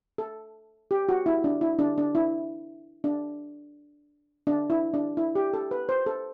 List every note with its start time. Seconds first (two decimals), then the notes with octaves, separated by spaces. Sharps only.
0.18 A4
0.91 G4
1.09 F#4
1.26 E4
1.44 D4
1.61 E4
1.79 D4
1.98 D4
2.15 E4
3.04 D4
4.47 D4
4.70 E4
4.94 D4
5.17 E4
5.35 G4
5.54 A4
5.71 B4
5.89 C5
6.06 A4